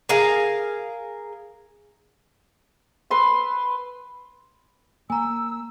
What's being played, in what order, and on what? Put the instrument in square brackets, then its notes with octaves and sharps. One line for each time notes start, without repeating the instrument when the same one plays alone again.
[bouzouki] G#4 A#4 F5
[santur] B4 C6 E6
[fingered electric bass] A#3 [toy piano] G#5 A#5 [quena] E6